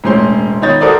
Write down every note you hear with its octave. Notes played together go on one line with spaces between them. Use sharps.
E1 A2 C#4 C5 C6
D#3 B3 C#5 D#5 G6 A6
F#4 A4 A#4 C5 D5 D#6